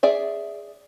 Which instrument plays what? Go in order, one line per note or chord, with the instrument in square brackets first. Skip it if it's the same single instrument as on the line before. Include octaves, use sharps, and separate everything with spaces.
[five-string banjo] G#4 D5 E5